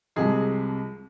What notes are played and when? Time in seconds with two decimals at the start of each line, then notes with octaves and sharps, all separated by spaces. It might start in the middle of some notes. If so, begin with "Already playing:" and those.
0.16 C2 C3 F3 G#3 G#4